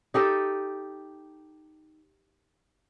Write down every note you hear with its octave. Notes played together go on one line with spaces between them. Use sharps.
D#4 G4 A4 D#5